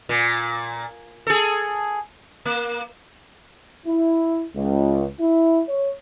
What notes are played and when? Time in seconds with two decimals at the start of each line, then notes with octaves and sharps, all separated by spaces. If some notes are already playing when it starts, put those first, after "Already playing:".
0.09 A#2
1.27 G#4 A4
2.45 A#3
3.86 E4
4.53 C#2
5.19 E4
5.68 C#5